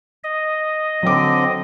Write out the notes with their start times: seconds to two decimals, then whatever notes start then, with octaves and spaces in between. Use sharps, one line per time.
0.24 D#5
1.03 D3 F#3 C4 D6